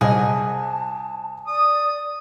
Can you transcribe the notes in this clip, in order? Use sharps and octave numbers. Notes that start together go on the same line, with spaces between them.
C2 G#4 D#5 A5
D5 D#6